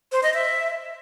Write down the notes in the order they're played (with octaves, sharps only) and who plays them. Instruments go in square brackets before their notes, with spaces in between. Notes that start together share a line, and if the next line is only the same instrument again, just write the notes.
[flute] C5
D#5
E5